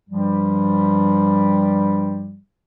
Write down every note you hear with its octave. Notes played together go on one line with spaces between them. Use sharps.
G2 F3 G3